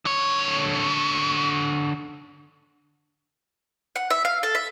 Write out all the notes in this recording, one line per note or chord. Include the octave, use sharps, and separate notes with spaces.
D3 C#5
F#5
E5
F5
A4
E5